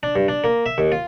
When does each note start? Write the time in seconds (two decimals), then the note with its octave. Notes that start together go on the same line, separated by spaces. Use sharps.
0.03 D4
0.16 G2
0.28 D4
0.44 A#3
0.66 E5
0.78 D#2
0.92 F4